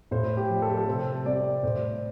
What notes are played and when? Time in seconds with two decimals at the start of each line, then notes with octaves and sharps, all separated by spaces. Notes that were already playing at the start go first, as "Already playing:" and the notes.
0.11 A2 C5
0.37 G4
0.49 F3 D4
0.62 A4
0.70 G4
0.78 A4
0.87 C3 C5
1.25 G3 C4 D5
1.63 A2 C5